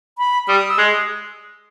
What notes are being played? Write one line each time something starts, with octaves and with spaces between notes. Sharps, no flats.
B5
G3 D#6
E6
G#3 D#6